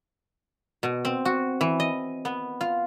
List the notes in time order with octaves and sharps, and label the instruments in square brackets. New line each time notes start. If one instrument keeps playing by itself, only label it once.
[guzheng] B2
C4
F#4
E3
D#5
B3
F4